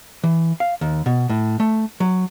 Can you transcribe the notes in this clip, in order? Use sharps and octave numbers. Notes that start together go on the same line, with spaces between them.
E3
F5
D#2
B2
A2
A3
F#3